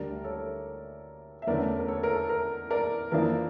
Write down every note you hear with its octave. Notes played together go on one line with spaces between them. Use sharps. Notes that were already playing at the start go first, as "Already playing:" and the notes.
Already playing: D2 D3 G3 A#4 D5
A4 C#5
E5
E2 D3 A3 C#4 A#4 D5
A#4
A4 C#5
A#4
A4
A#4
A#4 D5
F2 E3 A#3 D4 A#4